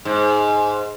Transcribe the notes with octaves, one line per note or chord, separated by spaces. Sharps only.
G#2